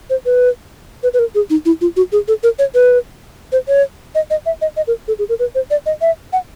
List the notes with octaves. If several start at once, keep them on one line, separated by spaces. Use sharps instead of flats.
C5
B4
B4
B4
A#4
G#4
D#4
E4
F4
F#4
G#4
A4
A#4
C#5
B4
C5
C#5
D#5
D#5
E5
D#5
D#5
A#4
A4
G#4
A#4
B4
C5
D5
D#5
E5
F#5